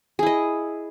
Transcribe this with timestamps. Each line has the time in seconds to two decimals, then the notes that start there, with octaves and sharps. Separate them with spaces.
0.19 G#4
0.23 E4
0.26 D#5